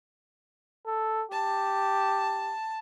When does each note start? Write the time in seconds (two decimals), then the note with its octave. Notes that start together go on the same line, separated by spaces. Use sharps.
0.86 A4
1.32 G4 A5